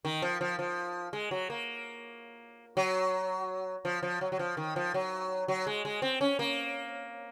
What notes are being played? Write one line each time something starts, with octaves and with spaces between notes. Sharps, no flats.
D#3
F3
F3
F3
G#3
F#3
A#3
F#3
F3
F3
F#3
F#3
F3
D#3
F3
F#3
F#3
G#3
G#3
C4
C#4
A#3